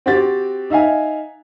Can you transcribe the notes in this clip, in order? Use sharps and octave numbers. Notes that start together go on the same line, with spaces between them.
C4 F#4 G4 A6
D#4 E5 F5 G#5